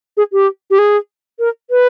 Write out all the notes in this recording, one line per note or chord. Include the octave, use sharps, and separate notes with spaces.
G#4
G4
G4
G#4
A#4
B4